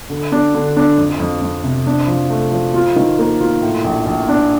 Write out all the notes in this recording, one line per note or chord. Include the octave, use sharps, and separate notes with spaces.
D3
D4
D3
D4
F2
F2
F2
C3
D4
F3
A3
F3
F4
D#3
A#3
F4
A2
A#1
A#1
D4